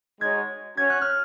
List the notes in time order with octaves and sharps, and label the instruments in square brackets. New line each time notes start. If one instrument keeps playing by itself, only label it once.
[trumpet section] G#3 D#4 F#4 C#5 [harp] G#6
[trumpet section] C#4 F#4 C#5 [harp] G#6
[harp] F#6
F6